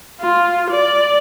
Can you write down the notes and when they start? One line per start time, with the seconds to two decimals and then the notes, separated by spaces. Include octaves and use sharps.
0.21 F4
0.70 D5